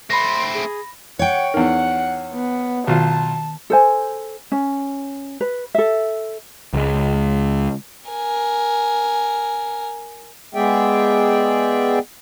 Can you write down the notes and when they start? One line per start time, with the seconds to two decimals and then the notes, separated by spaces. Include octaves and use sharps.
0.10 A3 C4 B5 C6 A#6
0.54 G#4
1.19 C#5 F#5 G5
1.54 E2 D#4 A#4 F#5
2.34 B3
2.87 B1 D#3 F4 F5 A5
3.70 A4 C5 G#5
4.52 C#4
5.41 B4
5.75 A4 E5
6.73 C#2 G#3
8.10 A#4 G#5
10.54 G#3 B3 G#4 D5 E5 G5